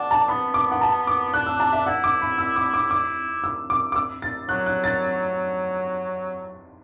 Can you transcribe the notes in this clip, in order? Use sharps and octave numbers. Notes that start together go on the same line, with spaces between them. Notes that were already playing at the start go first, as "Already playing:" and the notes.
Already playing: D4 F#5
A5
B3 B5
D6
F#5
A5
D6
D4 F#6
E6
A5
E5
E4 F#5
D6
B5
E6
D6
D6
E4 D6
E6
D6
D6
E6
A6
F#3 F#6
F#6
A6